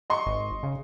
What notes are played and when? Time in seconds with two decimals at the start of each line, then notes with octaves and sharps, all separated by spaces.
0.10 D#5 C6 C#6
0.26 G#1
0.63 C#3